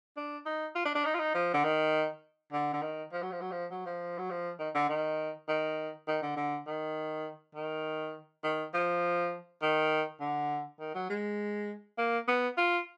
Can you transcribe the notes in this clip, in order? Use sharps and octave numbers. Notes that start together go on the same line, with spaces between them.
D4
D#4
F4
D4
D4
D#4
F4
D#4
F3
D3
D#3
D3
D3
D#3
F3
F#3
F3
F#3
F3
F#3
F3
F#3
F3
D#3
D3
D#3
D#3
D#3
D3
D3
D#3
D#3
D#3
F3
D#3
D3
D#3
F#3
G#3
A#3
B3
F4